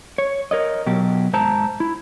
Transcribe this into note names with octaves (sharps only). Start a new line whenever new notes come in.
C#5
A#4 C#5 D#5
B2 F#3 G4
G#2 C5 A5 A#5
E4